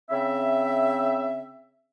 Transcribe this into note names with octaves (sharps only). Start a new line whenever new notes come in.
C#3 C4 E5